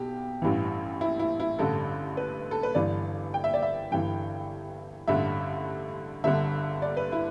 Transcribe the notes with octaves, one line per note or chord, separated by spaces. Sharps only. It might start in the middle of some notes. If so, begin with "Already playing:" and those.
Already playing: B1 B2 G4
A1 G2 E3
E4
E4
E4
A1 G2 D3 A4
B4
A4
B4
G1 G2 E3 D5
G5
E5
D5
E5
G1 G2 E3 G5
A1 G2 D3 E5
G1 G2 D3 E5
D5
B4
E4